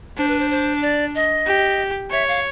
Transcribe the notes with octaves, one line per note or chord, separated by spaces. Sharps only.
D4 C5
B4
C5
C5
D5
D#5
G4
C#5 E5
F5